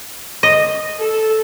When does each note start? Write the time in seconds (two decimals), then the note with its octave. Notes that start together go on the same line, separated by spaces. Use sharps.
0.43 D#5
0.98 A4